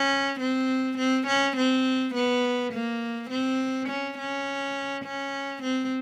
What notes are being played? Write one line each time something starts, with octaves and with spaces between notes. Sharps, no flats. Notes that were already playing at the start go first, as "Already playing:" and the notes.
Already playing: C#4
C4
C4
C#4
C4
B3
A#3
C4
C#4
C#4
C#4
C4